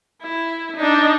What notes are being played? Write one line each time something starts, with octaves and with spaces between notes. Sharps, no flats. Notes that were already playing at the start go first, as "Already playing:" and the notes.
E4
D4 D#4